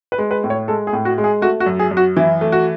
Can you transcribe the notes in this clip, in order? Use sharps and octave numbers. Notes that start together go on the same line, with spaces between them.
B4
G#3
B4
A2
C#5
G#3 A4
G#4
A2
F#4
G#3
G#4
A3 F#4
F#4
F#2
G#4
F#2
F#4
E3 E4
A3
F#4